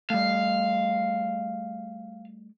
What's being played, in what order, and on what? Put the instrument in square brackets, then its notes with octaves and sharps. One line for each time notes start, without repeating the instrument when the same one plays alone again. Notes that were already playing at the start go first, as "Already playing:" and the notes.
[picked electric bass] G3 A3 [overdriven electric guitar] F5